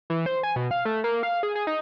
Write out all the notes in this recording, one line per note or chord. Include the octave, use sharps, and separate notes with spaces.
E3
C5
G#5
B2
F5
A3
A#3
F5
G#4
G#4
D#4